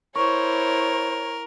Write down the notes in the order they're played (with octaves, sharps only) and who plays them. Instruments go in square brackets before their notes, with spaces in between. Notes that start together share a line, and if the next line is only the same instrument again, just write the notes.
[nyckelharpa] E4 C5 [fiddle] A#4 [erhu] C#5 [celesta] C#6